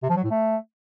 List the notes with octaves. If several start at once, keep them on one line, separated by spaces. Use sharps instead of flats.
C3
F3
F#3
A2
A3